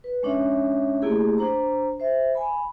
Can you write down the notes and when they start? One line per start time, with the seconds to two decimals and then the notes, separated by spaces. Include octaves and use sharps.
0.04 B4
0.23 G#3 C#4 D4 C#5 E5
1.02 A3 A#3 E4 G4 G#4
1.38 D4 C5 A#5
2.00 C5 E5
2.35 G#5 B5